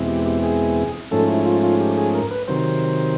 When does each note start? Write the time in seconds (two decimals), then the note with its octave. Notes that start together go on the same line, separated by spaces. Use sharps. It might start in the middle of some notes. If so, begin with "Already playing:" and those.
Already playing: E2 B2 G#3 C4 E4
0.08 G4
0.26 G4
0.43 G#4
1.11 G#2 F3 A3 C#4 A4
1.28 E4
1.45 F4
1.63 F4
1.80 G4
1.97 G#4
2.14 A#4
2.31 B4
2.48 C3 D#3 F#3 C5